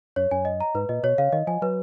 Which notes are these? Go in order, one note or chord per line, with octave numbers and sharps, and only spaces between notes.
F#2 C#5
F#2 G#5
D#5
A#5
G#2 B4
A#2 D#5
B2 C#5
C#3 F5
D#3 D#5
F3 G#5
F#3 B4